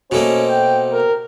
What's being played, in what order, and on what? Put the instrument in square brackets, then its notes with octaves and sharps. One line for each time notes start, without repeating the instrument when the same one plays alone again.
[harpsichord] B2 A3 A#3 [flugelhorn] C#4 [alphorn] C5
[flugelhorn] G5
A#4